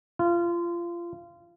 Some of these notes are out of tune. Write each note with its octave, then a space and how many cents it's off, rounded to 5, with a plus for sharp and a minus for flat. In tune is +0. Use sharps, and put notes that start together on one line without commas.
F4 -25